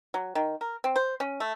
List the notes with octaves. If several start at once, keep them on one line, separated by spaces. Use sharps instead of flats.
F#3
D#3
A#4
C4
C5
C#4
A3